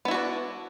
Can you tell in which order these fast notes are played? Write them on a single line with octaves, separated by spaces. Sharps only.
B3 E4 F#4 D4